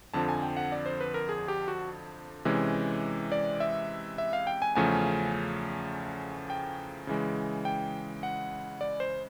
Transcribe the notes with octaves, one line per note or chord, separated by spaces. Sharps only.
F2 D3 F3 A5
G#5
G5
F#5
D5
C5
B4
A#4
G#4
G4
F#4
C3 E3 G#3 C#4
D5
E5
E5
F5
G5
G#5
E2 C#3 F3 A3 C#4 G#5
G5
C#3 E3 G#3
G5
F#5
D5
C5